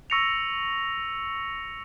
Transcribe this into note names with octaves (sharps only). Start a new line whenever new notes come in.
C#6 E6 A#6 C#7 F7